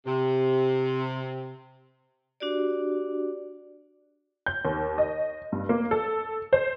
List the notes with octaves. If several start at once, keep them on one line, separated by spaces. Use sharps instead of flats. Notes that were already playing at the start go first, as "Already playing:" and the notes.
C3
D4 F#4 G4 D5
G6
D#2
D#5
G2
A#3
A4
C5